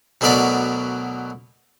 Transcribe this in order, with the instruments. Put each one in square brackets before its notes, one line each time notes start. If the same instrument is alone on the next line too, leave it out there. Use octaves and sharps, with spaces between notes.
[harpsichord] D2 B2 F#3 B3 A#4 D5